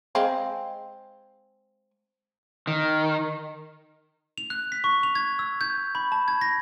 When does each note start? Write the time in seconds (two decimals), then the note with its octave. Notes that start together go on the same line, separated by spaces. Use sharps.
0.15 G#3 C4 F5
2.67 D#3
4.38 F7
4.50 F#6
4.72 B6
4.84 C#6
5.03 F7
5.15 G#6
5.39 E6
5.61 G6
5.95 B5
6.12 A5
6.28 G#6
6.41 A#6